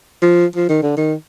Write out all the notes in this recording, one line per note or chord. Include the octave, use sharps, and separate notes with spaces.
F3
F3
D#3
D3
D#3